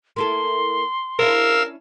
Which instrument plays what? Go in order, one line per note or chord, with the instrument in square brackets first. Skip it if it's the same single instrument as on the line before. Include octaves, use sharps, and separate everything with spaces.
[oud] A#3 E4 A4 [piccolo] C6
[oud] C#4 D4 E4 [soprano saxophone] A#4 [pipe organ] F5 E6